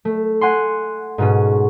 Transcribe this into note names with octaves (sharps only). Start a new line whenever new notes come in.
A3
F#5 G#5 C6
G#2 B2 C#4